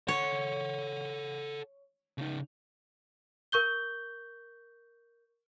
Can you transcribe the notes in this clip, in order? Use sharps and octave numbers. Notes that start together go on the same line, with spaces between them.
A4 C#5 F#5
C#3 D#4
A#4 C#6 G6 G7